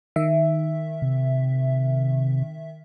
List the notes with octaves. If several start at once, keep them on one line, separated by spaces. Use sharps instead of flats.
D#3 E5
C3